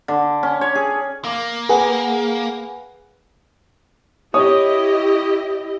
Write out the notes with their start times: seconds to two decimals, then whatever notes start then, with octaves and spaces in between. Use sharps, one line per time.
0.08 D3
0.43 C#4
0.61 C#5
0.75 G#4
1.24 A#3 D6
1.69 G#4 B4 F#5
4.34 E4 G4 C#5 D#5 D#6